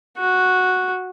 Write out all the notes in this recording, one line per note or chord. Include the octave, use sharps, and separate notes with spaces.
F#4